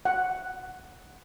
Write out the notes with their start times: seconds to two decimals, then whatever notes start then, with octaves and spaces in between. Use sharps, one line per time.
0.05 F#5